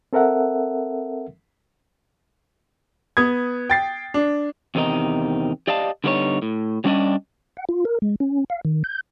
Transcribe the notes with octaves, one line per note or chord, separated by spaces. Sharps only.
C4 A4 A#4 E5 F#5
B3 D#6 G#6
G5 A6 C7
D4
E2 C3 D#3 D#4
G4 D5 D#5 F5 A5
D3 G3 B3 D4 D#4 C#5
A2
F#3 G3 C#4 D4 D5 D#5
F#5
F4
A#4
G#3
C#4
F5
D#3
G6